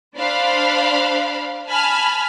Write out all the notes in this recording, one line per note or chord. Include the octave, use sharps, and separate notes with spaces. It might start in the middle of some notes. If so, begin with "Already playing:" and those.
D4 C5 F5 B5
G#5 A5 B5 F6